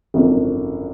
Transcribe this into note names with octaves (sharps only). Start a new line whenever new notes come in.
G#1 F#2 D3 F3